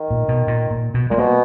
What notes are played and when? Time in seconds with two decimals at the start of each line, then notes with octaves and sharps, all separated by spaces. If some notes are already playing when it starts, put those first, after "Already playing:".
Already playing: D#3
0.10 A#2
0.28 B2
0.48 A#2
0.71 A#2
0.94 B2
1.10 A#2 G#3
1.18 B2 A#3